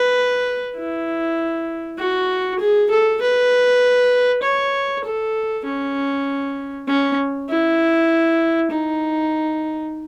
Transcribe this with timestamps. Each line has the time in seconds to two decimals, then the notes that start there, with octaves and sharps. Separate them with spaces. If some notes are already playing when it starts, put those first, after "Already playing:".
Already playing: B4
0.76 E4
1.98 F#4
2.59 G#4
2.90 A4
3.21 B4
4.43 C#5
5.04 A4
5.65 C#4
6.87 C#4
7.50 E4
8.71 D#4